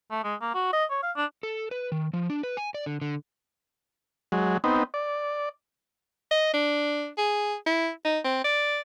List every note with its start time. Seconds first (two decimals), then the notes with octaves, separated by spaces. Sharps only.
0.11 A3
0.24 G#3
0.41 A#3
0.54 F#4
0.73 D#5
0.90 C#5
1.03 F5
1.16 D4
1.43 A4
1.71 B4
1.92 D#3
2.13 F3
2.30 D4
2.43 B4
2.57 G#5
2.74 D5
2.86 D3
3.02 D3
4.32 F#3 G#3
4.64 B3 C4 D#4
4.94 D5
6.31 D#5
6.54 D4
7.18 G#4
7.66 E4
8.05 D#4
8.24 C4
8.44 D5